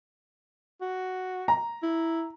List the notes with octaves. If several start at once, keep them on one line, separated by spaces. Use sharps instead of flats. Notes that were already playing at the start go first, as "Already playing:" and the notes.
F#4
A#5
E4